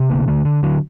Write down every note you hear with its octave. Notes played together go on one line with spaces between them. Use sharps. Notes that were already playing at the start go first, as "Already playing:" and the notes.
Already playing: C3
D3 A#3
D3 A3
D3
D3 F#3